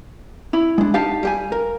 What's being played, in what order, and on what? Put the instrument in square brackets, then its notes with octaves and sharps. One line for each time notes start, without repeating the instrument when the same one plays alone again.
[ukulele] E4
[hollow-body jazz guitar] G#3 D4
[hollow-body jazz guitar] D#4 G4 A5 [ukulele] F5
[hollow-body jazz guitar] G3 G4 G#5
A#4